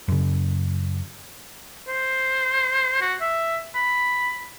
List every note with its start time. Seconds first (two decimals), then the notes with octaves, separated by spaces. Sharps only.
0.08 F#2 C#3
1.88 C5
3.01 F#4
3.21 E5
3.75 B5